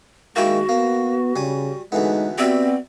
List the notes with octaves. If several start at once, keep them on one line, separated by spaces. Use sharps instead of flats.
D#3 G#3 A#3 E4 F#4 G5
A#3 B3
C#3 G3 G#5
D2 E3 G#3 B3 D#4 A4
B3 C4 F#4 G4 D5 E5